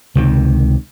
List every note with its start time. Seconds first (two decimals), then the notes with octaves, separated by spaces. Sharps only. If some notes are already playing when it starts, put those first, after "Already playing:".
0.15 C#2 C3 D#3